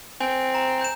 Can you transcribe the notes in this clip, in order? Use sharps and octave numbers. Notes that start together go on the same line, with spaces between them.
C4 G#5
A#5
G6 E7